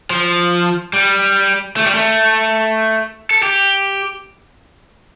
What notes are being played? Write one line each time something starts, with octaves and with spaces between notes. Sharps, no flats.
F3
G3
A3
G3
A3
A4
G4